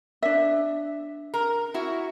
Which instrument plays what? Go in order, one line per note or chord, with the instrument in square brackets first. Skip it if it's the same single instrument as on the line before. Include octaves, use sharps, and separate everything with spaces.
[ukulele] D4 E5
[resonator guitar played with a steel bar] A#4
E4 F#4